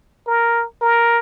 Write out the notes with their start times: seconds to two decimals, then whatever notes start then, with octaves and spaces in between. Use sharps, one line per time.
0.27 A#4
0.82 A#4